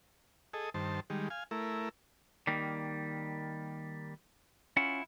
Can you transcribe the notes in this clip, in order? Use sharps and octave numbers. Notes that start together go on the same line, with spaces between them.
G#4 A4 D#5
G2 D#3 C5 A5
D#3 G3 G#3
F5 G#5
A3 E4 A#4
D#3 G3 A#3
C#4 E4 F4 F#5